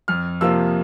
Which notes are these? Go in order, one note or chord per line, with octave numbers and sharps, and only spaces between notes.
F2 F6
C3 F3 A#3 F4 E6